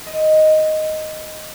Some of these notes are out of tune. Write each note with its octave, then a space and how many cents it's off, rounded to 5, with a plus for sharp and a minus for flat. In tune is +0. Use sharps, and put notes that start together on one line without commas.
C4 +0 D#5 +0